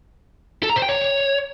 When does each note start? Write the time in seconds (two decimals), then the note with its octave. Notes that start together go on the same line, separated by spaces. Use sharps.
0.63 A4
0.70 A#5
0.76 C5
0.82 G5
0.89 C#5